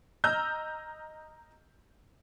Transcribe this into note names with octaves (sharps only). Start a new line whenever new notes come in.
D#5 A#5 E6 F6 G6